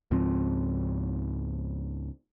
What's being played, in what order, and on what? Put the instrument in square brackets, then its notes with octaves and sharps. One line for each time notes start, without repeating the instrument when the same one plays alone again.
[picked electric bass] C#2 G#2 F3 C4